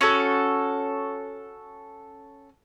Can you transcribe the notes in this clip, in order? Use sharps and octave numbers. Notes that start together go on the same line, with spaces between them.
C#4 F#4 A4